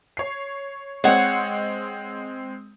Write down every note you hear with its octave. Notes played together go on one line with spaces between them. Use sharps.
C#5 C7
G#3 C4 C#5 F#5